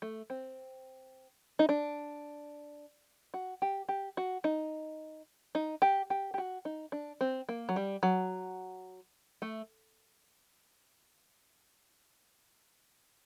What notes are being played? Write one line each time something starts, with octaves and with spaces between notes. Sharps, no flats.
A3
C4
D#4
D4
F#4
G4
G4
F#4
D#4
D#4
G4
G4
G4
F#4
D#4
D4
C4
A#3
F#3
G3
F#3
A3